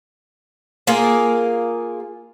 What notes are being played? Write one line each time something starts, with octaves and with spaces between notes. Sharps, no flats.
A#3 F4 G#4 A#4